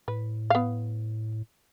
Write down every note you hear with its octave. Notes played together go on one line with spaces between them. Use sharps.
A2 B4
B3 F5